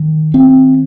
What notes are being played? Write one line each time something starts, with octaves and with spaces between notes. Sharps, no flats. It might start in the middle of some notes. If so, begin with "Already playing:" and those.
Already playing: D#3
C4